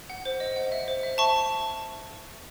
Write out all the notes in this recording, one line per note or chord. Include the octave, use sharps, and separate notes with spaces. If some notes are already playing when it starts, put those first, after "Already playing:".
F#5
C5
D#5
F#5
E5
C5
E5
E5 A5 C#6